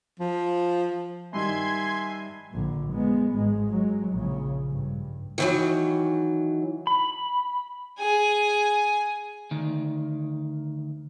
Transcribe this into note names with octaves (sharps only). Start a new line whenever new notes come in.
F3
G2 D#3 E5 G#5 C6 G#6
A#1 D3
G#3 B3
G#1 G#3
F#3 G#3
A#1 C#3
G2
D#3 E3 F#3
B5
G#4 G#5
D2 D#3